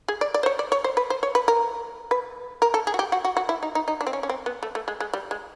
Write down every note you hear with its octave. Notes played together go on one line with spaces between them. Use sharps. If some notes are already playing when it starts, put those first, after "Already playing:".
G#4
D5
D5
C5
C#5
D5
C#5
C5
B4
C5
C#5
B4
A#4
B4
A#4
A4
G#4
F#4
G4
F#4
F#4
F#4
E4
D#4
D#4
D#4
D4
C4
C#4
C#4
C4
B3
A3
A3
G#3
G#3
G3
G#3